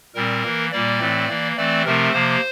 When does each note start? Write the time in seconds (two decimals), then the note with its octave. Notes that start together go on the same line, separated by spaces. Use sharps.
0.15 A#2 G3 C4 A#4
0.43 E3 A#3
0.72 A#2 G3 A#3 D5
0.99 A2 E3 A3 C4
1.29 E3 A#3
1.56 E3 A3 C4 D5
1.85 C3 F3 A3 C4 A#4
2.12 C3 F3 A#3 C5